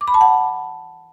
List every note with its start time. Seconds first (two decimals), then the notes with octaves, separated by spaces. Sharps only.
0.01 D6
0.08 B5
0.14 A5
0.21 F#5